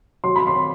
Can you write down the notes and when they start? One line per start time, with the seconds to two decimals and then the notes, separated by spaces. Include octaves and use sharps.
0.24 F#3 C6
0.36 B5
0.47 C6